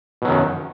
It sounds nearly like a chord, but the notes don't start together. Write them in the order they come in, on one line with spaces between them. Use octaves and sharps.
B2 F#3 D#3 F#2